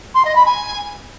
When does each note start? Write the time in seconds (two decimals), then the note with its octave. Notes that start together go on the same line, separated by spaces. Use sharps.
0.14 C6
0.25 D#5
0.35 B5
0.45 G#5